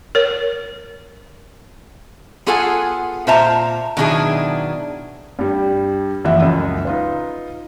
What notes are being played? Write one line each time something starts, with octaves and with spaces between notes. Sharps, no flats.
A#4 C#5
B3 F4 G#4 A4 F#5 G#5
A#2 F4 C5 E5 A5 A#5
B2 D#3 F#3 D4 E4 G#4
G2 G3
F#1 E3 F3 E5 F#5
C#2 F#2
D#4 F4 B4